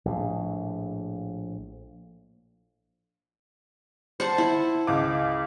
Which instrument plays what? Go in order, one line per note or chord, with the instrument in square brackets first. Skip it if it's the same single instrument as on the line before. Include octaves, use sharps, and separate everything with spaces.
[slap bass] A#1 A2
[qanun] C5 F#5 A5
E4
[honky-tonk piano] C#2 D6